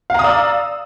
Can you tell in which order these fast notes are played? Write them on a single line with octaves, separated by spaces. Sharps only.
F5 A#5 D#6 D5 E6